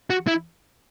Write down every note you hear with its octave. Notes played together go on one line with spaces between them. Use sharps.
F#4
E4